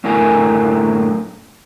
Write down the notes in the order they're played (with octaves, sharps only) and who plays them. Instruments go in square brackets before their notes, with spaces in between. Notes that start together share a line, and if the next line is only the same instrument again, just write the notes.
[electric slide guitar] F#2 A2 D3 E4 A#4 G#5